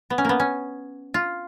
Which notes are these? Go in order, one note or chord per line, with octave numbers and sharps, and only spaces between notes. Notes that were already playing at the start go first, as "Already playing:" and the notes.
B3
C#4
A#3 B3
C#4
F4